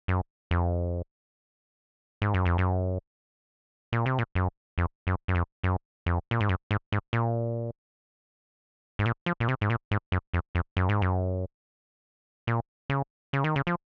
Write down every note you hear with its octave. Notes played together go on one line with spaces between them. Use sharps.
F#2
F2
G#2
F#2
F2
F#2
A#2
C3
A#2
F#2
F2
F#2
F#2
F2
F#2
F2
A#2
G#2
F#2
G#2
G#2
A#2
G#2
A#2
F3
A#2
C3
G#2
A#2
G#2
F#2
F2
F2
F#2
G#2
F#2
A#2
C#3
C#3
D#3
C#3
F3